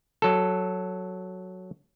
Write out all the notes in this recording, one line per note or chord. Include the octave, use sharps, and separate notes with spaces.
F#3 A4